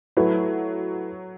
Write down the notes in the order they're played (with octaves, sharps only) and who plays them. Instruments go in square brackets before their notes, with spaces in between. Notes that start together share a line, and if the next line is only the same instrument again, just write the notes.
[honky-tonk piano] F#3 [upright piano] A3 E4 B4